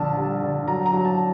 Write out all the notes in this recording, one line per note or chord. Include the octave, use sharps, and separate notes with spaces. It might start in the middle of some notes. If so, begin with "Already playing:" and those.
Already playing: A#1 D3 A5
G3
D3
F#3 A#5
A#5
F#3
A5